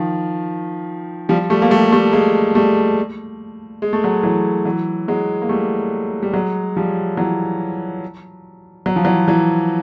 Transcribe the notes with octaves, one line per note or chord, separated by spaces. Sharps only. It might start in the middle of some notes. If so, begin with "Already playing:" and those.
Already playing: D#3 F3
F3 G3
G3 A3
A#3
G3 A3
G3 A3
G#3 A#3
G3 A3
G#3
A3
F#3 G#3
E3 F#3
E3 F#3
F#3 G#3
A#3
G3 A3
G3
F#3 G#3
F3 G3
E3 F#3
F#3
F3
E3 F#3
E3 F#3